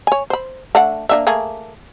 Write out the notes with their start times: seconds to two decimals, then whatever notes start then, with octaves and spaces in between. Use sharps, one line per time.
0.07 C#5 G#5
0.30 C5 B5
0.75 A3 D4 F#5
1.09 A#3 D4 E5
1.27 A3 A#3 G#4